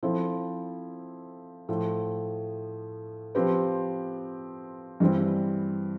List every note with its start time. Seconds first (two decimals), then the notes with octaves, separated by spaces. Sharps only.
0.03 F3 C4 E4 A4
1.69 A2 F3 A3
3.35 F3 C4 G4 B4
5.00 G2 E3 G3 C4